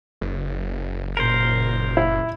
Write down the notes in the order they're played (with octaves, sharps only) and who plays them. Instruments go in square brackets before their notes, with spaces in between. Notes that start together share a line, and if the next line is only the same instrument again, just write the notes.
[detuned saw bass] F#1
[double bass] A#2 [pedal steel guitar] A#4 C5
[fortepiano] E4